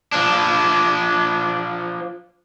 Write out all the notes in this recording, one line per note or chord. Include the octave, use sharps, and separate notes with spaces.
F3 D4